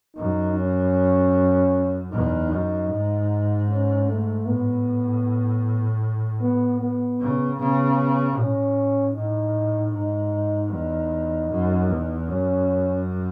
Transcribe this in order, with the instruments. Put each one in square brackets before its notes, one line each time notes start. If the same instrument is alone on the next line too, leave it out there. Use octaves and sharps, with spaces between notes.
[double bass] F#2 [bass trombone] D#4
[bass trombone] C#4
[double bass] E2 [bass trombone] D#4
[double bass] F#2 [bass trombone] D#4
[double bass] G#2
[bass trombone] C#4
A3
[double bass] A2 [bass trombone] B3
[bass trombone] B3
B3
[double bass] C#3
[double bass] C#3 [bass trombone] B3
[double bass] A2 [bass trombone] C#4
[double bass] A2 [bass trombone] D#4
[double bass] G#2 [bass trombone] D#4
[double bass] E2 [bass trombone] D#4
[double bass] F#2
E2
[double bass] F#2 [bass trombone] C#4